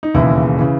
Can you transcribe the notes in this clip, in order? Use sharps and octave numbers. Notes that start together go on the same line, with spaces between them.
D#4
E1 D#2 C#3 E3 E4
C#3 E3